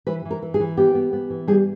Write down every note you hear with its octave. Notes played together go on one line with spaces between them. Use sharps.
E3 B4
E3
A#4
E3
G#4
E3
B3 G4
B3
B3
E3
G3 G#4